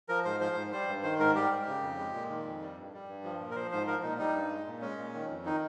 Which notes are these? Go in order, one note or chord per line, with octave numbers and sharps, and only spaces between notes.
F3 A#4
G#2 C5
F3 C5
G#2
G3 C5
G2
D#3 C5
G#2 A#4
G3 G4
G#2
C#3
F2
G#3
A#2
D#3
F2
G3
G2
G3
G2
F3
A#2
A#4
F3 C5
G#2 C5
F3 A#4
A#2 D#4
G3 D#4
G2
G#3
A#2
G#3 C#4
A#2
D#3
F2
D#3 D#4